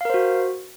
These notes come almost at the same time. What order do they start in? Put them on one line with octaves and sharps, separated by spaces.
F5 A#4 C5 F#4